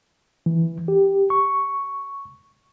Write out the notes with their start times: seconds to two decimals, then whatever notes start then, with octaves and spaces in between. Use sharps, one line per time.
0.46 E3
0.88 G4
1.30 C#6